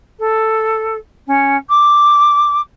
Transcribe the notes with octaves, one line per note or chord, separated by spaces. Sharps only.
A4
C#4
D6